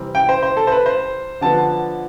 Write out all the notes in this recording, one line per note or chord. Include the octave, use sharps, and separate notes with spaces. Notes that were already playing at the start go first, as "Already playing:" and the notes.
Already playing: C3 E3 G3 C4
G5
C5
C5
A4
C5
B4
C5
D3 F3 B3 A5